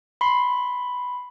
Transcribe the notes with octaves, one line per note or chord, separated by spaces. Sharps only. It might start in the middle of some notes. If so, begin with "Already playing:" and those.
B5 C6 C7